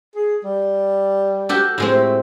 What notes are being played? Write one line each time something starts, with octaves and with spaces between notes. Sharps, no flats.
G#4
G3
F#4 G4 A4
A2 G#3 C4
A3